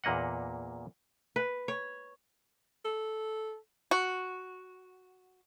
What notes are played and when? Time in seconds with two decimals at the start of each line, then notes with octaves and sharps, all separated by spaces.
0.04 E2 A#2 A#3 D#5 F#5
1.36 B4
1.68 C#5
2.85 A4
3.91 F#4